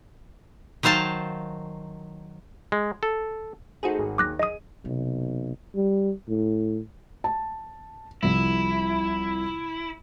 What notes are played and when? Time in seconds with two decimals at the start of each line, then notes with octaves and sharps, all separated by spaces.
0.83 D#3 F#3 C5 F5 A5
2.72 G#3
3.03 A4
3.83 A3 D#4 F#4 G#4 C5
3.99 G#1
4.18 D#2 D6 F#6 A#6
4.39 G#4 D#5 D#6 D#7
4.85 B1 C3
5.76 G3
6.28 A2
7.24 A5
8.23 C2 F3 E4